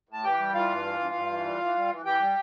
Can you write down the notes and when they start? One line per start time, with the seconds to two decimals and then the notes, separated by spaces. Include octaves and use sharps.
0.09 A2 A5
0.24 E3 G4 G5
0.39 G3
0.54 E3 F4 F5
0.70 G2
0.84 E3
0.99 G2
1.14 G2
1.30 E3
1.45 G3
1.60 E3
1.76 G3
1.91 E3
2.05 E3 G4 G5
2.20 G3